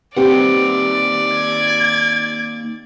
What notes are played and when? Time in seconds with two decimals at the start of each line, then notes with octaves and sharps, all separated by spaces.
0.17 A#3 C4 D#4 G4 B4 D5 F#5
1.33 G#6